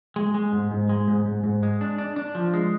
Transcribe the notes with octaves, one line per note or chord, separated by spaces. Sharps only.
G#3
G#3
G#2
G#2
G#3
G#2
G#2
G#2
G#3
D4
D4
D4
F3
G#3